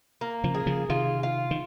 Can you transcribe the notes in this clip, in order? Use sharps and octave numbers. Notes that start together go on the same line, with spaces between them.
A#3
C#3 F3
G#4
C#3 F3
C3 D#3 F4
F4
D#3